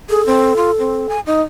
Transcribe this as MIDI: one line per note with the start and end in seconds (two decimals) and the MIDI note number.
0.09 0.22 68
0.09 1.15 69
0.26 0.56 60
0.57 0.71 65
0.79 1.07 60
1.09 1.20 80
1.26 1.42 63